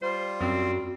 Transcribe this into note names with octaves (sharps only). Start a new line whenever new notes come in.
G3 F4 C5
F#2 C4 F#4